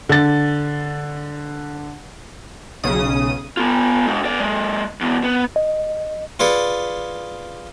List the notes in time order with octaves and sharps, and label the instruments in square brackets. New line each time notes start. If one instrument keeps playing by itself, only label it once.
[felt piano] D3 A6
[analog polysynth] B1 C#3 D#6
[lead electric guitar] B3 F4
G#3 D4
B3 D5
G#3 A#3
E2 B2
B3
[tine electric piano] D#5
[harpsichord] F4 G#4 B4 D5 F#5